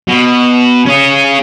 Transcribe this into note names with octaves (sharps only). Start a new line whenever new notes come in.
B2
C#4 G#4